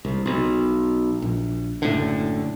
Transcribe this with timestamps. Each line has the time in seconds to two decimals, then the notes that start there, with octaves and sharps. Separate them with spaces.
0.05 C2
0.26 B1
1.22 A#1
1.82 F#1 A2 D3